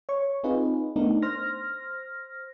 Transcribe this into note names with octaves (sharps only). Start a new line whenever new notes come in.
C#5 C#6
C4 D#4 F4 G#4 B4
A3 B3 D4 D#4 A#4
C5 F6 A#6